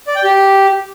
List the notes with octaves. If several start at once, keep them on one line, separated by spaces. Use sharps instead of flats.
D5
G5
G4